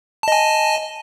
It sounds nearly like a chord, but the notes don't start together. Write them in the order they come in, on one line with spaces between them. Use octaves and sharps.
A5 D#5 G#5